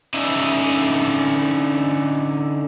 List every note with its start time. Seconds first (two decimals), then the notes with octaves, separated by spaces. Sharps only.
0.14 D3 C#4 D#4 D#5 E5